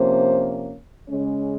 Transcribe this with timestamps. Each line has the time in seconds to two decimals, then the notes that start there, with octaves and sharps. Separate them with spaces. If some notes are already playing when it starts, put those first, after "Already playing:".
Already playing: C3 F3 A#3 C#4 C5
1.09 C#3 G#3 C#4